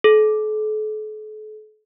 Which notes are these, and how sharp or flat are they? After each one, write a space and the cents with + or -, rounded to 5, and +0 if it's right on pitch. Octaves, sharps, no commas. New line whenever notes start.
A4 -45